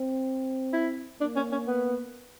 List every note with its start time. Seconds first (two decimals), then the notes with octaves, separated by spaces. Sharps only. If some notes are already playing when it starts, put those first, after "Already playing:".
Already playing: C4
0.73 E4
1.20 A#3 D4
1.36 C#4
1.52 C#4
1.68 B3